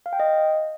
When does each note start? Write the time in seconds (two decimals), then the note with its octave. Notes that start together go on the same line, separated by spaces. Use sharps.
0.06 F5
0.13 G5
0.20 D#5